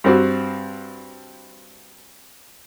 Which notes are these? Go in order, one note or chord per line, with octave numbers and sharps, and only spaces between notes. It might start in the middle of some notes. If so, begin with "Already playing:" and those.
G2 C4 F#4